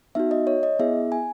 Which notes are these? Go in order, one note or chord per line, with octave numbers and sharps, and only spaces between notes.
B3 D#4 F#4 E5
D#5
C#5
D#5
B3 E4 G#4 E5
G#5